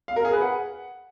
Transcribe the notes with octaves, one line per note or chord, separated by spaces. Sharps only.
F5
A#4
G#4
B4
F#5